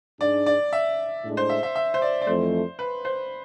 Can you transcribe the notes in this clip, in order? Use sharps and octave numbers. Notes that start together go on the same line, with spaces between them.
G#2 G#3 D4 D5
D5
E5
A2 G#3 D4
C5
E5
E5
E5
C5
D5
D5
F2 E3 A3 C5
B4
C5